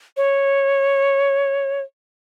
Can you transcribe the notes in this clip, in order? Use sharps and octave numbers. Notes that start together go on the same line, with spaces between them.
C#5